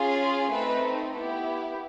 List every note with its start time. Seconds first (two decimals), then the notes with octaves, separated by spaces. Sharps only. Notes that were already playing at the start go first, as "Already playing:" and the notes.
Already playing: C#4 F4 G#4
0.53 A3 C4 D#4 B4
1.15 B3 E4 G4